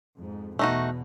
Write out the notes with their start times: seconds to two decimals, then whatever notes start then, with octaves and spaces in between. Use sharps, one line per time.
0.16 F2 G#2
0.59 E2 B2 A3 D#4 F#4